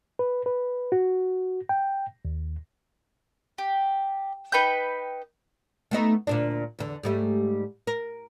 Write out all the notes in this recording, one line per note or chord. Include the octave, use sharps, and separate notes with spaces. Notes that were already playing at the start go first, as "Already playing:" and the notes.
B4
B4
F#4
G5
D#2
G4
D#4 B4 G5 G6
A3 B3 D#4
D2 A#2 D4
E2 D3
G#2 G3 A3
A#4